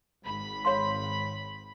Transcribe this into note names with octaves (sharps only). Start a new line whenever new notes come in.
G#1 B5
C#5 F5 C6